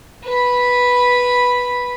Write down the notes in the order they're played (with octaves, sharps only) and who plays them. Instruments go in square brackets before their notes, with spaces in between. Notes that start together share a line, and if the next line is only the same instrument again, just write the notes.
[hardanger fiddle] B4 B5